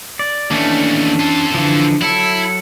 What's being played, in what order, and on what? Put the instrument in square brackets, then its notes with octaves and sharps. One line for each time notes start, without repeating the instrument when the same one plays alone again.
[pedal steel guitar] D5
[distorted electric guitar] D#2 A3 [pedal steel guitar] E3 C#4 D4
[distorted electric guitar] F4 A4
[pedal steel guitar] D3 E3 F3
[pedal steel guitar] F#3 A4 [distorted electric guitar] E4